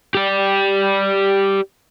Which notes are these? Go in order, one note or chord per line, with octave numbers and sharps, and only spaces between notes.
G4 D5